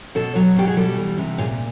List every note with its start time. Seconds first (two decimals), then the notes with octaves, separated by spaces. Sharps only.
0.15 B2 A4
0.35 F#3
0.56 B2 G4
0.67 G#4
0.77 G3 A4
0.98 E3
1.18 C3
1.38 A#2 G#4